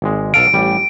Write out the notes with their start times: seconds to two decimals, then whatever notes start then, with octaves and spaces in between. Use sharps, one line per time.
0.02 G#1 G#3
0.34 B1 A4 F5 D7
0.54 A1 G3